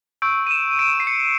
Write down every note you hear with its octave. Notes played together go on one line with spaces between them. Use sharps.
C#6 E6 G6 D7
D#7
E7
D7
C7
C#7